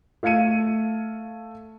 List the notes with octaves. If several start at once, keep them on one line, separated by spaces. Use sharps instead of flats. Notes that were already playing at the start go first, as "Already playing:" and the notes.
A3 F5 G#6 C#7 D#7